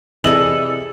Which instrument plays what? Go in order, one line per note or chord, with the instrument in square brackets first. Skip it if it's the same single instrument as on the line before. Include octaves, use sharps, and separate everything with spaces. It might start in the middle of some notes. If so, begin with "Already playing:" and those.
[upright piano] C3 E6 F#7 [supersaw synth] E3 [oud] G#4 D5 D#5 [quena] A4